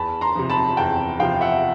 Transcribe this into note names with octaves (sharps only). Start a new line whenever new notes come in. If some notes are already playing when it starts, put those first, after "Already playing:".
Already playing: E2 A5 B5
A#5 C6
C3 F3
A5 B5
E2 G5 A5
C3 F3 F5 G5
E5 F#5